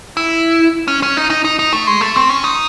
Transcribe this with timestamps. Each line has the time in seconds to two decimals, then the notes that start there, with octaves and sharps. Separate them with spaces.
0.17 E4
0.88 C#4
1.03 C#4
1.17 D#4
1.30 D#4
1.45 D#4
1.59 D#4
1.73 A3
1.87 G#3
2.01 A3
2.16 C4
2.29 C#4
2.44 D#4